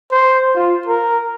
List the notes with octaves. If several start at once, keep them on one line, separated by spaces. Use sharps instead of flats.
C5
F4
A#4